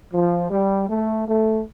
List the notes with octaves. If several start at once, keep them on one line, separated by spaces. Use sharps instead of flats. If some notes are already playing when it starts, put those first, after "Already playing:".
F3
G3
A3
A3